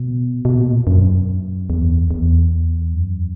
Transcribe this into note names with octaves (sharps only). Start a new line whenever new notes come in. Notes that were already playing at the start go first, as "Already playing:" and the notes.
Already playing: B2
B2
A#2
F#2
E2
E2
F#2